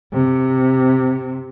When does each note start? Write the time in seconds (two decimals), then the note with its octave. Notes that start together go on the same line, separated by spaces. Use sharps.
0.14 C3